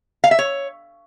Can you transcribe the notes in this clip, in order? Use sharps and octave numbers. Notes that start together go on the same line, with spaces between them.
F5
E5
C#5